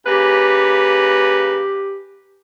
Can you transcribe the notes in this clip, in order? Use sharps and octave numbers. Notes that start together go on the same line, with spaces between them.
C#3 A#3 G4 B4